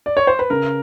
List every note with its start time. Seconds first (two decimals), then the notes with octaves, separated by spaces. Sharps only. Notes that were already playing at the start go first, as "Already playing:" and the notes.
0.06 D5
0.17 C#5
0.27 C5
0.39 B4
0.50 C#3 A#4